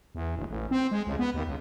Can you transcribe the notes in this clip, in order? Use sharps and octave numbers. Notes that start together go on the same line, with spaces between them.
E2
D1
A1
C4
G#3
C#2
B3
D#2
C#2